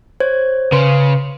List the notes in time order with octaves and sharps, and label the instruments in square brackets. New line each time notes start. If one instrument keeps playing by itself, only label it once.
[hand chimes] C5 C#5 G#6
[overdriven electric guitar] C#3 [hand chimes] B4 C6